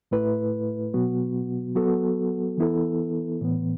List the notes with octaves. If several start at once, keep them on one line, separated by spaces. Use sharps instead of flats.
A2 A3 E4 B4
B2 F#3 B3 F#4
F#3 B3 F#4 A4
E3 B3 E4 A4
A2 E3 B3